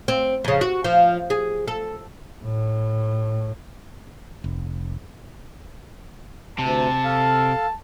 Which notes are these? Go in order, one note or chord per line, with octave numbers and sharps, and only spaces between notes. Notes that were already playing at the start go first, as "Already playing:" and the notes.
C4
F2 C#3
F#4
F3
G#4
A4
A2
F1
D2 C3 A5
A4 F5